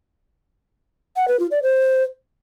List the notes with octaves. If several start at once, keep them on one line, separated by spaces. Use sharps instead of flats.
F#5
B4
F4
D5
C5